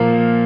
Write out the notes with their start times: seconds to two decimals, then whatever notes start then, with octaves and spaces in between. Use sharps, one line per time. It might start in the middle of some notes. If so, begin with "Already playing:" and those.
Already playing: A#2 F3 A#3 A#4